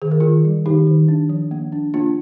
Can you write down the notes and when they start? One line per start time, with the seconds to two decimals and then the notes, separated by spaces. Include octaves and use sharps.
0.02 D#3 G#4
0.11 A#4
0.20 D#3 F4 G#4
0.45 G3
0.66 D#3 D#4 G4
0.87 D#3
1.08 D4
1.29 F3
1.51 A#3
1.72 D4
1.94 A#3 D4 F4